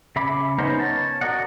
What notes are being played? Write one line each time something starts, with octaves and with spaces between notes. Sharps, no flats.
C#3 E5 B5 D6
B3 C#4 D#4 A#4 C5
C#5 A5
F#4 A#4 D5 D#5 F#5